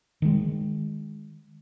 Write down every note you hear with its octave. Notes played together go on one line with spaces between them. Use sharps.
D#3 G#3